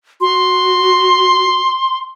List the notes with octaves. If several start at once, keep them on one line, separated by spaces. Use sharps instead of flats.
F#4 C6